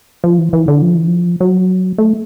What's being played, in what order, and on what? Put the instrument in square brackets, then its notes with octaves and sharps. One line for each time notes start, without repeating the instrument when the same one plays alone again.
[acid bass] F3
E3
E3
D3
F3
E3
F3
F#3
A3